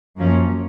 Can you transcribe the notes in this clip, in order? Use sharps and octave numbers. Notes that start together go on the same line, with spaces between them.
F#2 F3 A#3 C#4